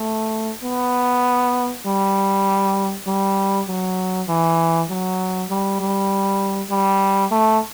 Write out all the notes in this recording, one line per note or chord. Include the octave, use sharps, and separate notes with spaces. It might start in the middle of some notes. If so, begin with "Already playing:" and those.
Already playing: A3
B3
G3
G3
F#3
E3
F#3
G3
G3
G3
A3